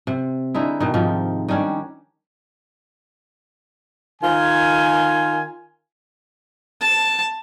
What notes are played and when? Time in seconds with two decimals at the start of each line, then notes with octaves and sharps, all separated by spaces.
0.07 C3
0.55 D3 G#3 D#4 E4
0.80 B2 D#3
0.94 G#2 C3 D#3 F3
1.49 D#3 G3 C#4 D4
4.22 D#3 F4 G#5
6.81 A5